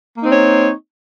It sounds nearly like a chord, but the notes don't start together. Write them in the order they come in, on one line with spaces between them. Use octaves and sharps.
A#3 D#4 C4 C#5